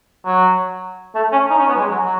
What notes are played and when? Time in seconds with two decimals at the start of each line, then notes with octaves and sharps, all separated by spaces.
0.26 F#3
1.15 A3
1.32 C#4
1.50 D#4
1.59 C#4
1.69 B3
1.75 F#3
1.80 G#3
1.91 F#3
2.04 F#3